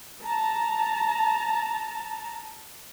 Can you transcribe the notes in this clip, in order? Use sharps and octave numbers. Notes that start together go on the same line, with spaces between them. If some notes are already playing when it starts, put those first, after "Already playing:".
A5 A#5